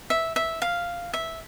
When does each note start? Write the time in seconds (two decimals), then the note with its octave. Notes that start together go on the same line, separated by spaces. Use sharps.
0.10 E5
0.36 E5
0.62 F5
1.14 E5